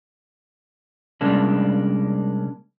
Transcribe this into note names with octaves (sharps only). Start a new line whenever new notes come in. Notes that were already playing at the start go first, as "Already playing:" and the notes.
C3 G3 G#3 A#3 C#4 D4